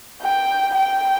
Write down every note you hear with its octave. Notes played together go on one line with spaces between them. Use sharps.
G5
G5